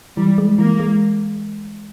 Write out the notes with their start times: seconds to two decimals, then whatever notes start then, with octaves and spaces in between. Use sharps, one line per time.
0.16 E3 G3
0.38 G#3
0.58 E3 A#3
0.80 G#3